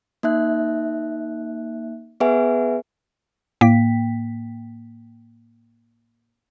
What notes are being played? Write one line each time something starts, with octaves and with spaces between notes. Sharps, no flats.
A#3 D#4 E5 F#6
B3 G#4 B4 E5 F#5 G#5
A2 A#3 G5 B6